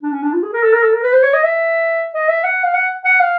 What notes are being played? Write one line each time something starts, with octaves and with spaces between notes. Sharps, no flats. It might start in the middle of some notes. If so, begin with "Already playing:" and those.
D4
C#4
D4
F4
G#4
A#4
A4
A#4
A4
A#4
B4
C5
C#5
D#5
E5
D#5
E5
F#5
F5
F#5
F#5
F5